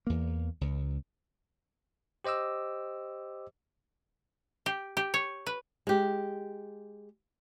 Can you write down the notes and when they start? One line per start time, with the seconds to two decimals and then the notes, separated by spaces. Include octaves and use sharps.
0.07 E2 A#3
0.61 C#2
2.24 G4 C5 D#5 D6 E6
4.66 G4
4.97 G4
5.14 C#5
5.47 B4
5.87 G#3 G4